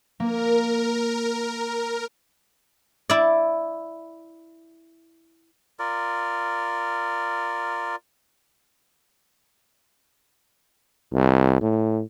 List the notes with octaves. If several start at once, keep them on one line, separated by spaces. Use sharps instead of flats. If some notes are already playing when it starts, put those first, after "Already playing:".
A#3 A#4
E4 D5
F4 A#4 D5
C2
A2